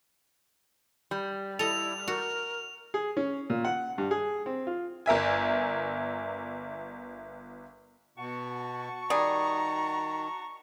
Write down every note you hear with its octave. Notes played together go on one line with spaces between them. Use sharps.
G3
E4 A4 D#5 F7
F#4 A#4
G#4
C#4
A#2
F#5
G2
G#4
C4
F4
G1 A#4 E5 G#5
B2 F#4 A5 C#6
D#3 G3 G#4 A#5